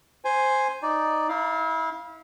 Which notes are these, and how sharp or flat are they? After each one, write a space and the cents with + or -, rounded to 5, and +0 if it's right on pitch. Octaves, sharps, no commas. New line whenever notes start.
C5 +0 G#5 +0
D#4 +0 D5 +0
E4 -30 F5 +0